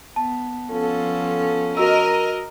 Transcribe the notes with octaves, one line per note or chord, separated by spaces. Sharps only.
B3 A5
F3 B3 C#4 F4 A4
F#4 A#4 D#5 E6